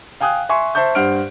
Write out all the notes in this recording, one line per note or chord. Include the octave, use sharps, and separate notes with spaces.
F5 G5 G#5 D#6 F#6
E5 G#5 C6 C#6
C5 E5 A5 C#6 G6
G2 C5 F#5 F6 D7